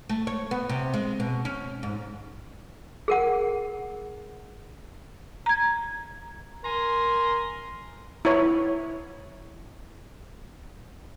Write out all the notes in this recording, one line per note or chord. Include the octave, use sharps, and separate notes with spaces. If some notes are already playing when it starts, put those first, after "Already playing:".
A3
C#5
B3
C3
G#3
B2
C#4
G#2
G#4 A#4 F#5
A#5 G#6
A#4 G#5 A#5 C6
E4 C#5